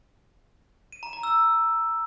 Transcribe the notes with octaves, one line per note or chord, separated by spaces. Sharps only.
D#7
A#5
A#5
E6